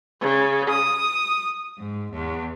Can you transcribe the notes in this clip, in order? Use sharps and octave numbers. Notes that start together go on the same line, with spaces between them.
C#3
D#6
G#2
E2